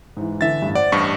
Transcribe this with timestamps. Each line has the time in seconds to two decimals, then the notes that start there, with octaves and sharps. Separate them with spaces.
0.17 G#2 E3
0.41 D3 E3 E5 A6
0.62 A1 G2
0.75 C5 D5 F#5
0.92 A1 G2 C#6